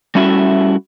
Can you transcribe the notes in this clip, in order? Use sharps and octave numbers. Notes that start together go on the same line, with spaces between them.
G3 A3 C#4 E4 F#4 E5